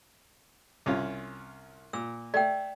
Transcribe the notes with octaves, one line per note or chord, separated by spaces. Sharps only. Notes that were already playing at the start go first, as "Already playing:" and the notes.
C2 C#4 F4
A#2 E6
A3 D5 G5